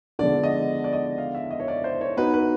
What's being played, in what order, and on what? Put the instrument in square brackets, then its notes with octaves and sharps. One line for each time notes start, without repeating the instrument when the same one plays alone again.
[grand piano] D3 F3 G#3 B3 D4 [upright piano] D5
[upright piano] D#5
D5
D#5
F5
E5
D#5
C#5
D5
C5
C#5
[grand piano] B3 D#4 F#4 [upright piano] B4
[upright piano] B4